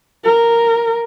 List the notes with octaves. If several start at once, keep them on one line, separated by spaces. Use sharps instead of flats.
A#4